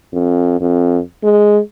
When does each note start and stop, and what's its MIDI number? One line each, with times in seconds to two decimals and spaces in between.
0.13 0.60 41
0.60 0.99 41
1.23 1.59 56